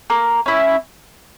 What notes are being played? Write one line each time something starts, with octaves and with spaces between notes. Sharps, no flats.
A#3
C#4 E4